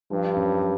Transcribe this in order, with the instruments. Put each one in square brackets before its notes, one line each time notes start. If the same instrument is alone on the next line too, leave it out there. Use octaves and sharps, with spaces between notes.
[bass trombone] G2 [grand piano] F3
[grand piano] F#2